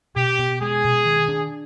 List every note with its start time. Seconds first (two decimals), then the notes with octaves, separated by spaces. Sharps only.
0.16 B2 G4
0.39 B2
0.61 G#3 G#4
0.84 B2
1.05 D#3
1.28 D4